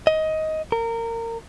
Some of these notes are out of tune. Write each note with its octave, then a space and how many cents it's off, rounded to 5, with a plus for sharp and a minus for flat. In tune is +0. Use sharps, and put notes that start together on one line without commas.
D#5 +15
A#4 -25